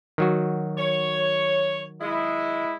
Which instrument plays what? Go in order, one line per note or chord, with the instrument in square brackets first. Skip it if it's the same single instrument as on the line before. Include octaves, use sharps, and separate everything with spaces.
[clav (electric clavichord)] D#3 F#3 F#4
[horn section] C#5
G#3 E4